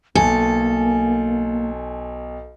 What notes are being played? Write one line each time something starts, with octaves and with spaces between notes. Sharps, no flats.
B1 A#3 A4 G#5